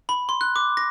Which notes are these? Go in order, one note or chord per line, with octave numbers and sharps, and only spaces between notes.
B5
C6
F#6
D6
A#6